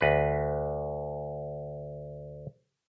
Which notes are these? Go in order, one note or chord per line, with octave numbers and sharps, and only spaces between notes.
D2 B4